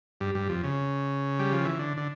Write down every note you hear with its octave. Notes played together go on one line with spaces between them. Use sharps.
G2
G2
F2
C#3
G3
F3
E3
D3
D3